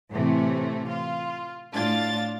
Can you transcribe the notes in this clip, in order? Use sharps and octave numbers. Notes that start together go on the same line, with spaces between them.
A2 C3 E3 A3
F4
A2 D4 F4 A6